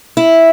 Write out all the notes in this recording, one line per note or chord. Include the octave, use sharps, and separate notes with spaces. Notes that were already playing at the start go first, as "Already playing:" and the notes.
E4